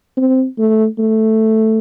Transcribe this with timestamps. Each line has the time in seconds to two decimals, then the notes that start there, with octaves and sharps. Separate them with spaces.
0.17 C4
0.58 A3
0.99 A3